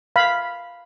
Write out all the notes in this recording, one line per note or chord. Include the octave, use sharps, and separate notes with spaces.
F5 B5